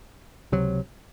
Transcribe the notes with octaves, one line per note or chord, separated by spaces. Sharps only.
C#2 C3 F#3